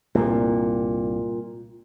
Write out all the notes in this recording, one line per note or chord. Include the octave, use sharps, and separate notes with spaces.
C2 G2 A#2